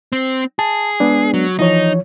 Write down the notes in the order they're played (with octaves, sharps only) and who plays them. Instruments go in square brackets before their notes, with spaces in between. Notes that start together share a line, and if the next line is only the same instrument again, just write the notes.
[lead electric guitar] C4
[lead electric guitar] G#4 [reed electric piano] A5
[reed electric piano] G#3 B3 D4
[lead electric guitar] F#3
[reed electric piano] E3 F3 C#5 [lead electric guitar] D#4